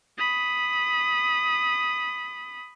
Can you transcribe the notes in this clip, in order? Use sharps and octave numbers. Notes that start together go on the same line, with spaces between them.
B5 D#6